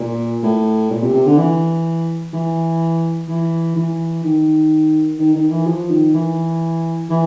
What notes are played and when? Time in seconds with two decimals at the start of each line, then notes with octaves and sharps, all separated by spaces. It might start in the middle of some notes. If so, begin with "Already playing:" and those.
Already playing: A#2
0.43 A2
0.90 A#2
1.02 C3
1.14 C3
1.26 D3
1.38 E3
2.33 E3
3.28 E3
3.76 E3
4.24 D#3
5.19 D#3
5.35 D#3
5.51 E3
5.66 F3
5.90 D#3
6.14 E3
7.10 E3